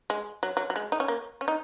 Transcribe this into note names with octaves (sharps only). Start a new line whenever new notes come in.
G#3
F#3
F#3
F#3
G#3
D#4
C#4
A#3
C#4
D#4